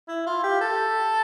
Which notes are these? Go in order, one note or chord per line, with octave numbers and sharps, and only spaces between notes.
E4
F4
G4
A4